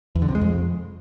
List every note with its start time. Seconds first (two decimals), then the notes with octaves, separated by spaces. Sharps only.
0.15 E2
0.22 D3
0.28 C3
0.35 G#3
0.41 F2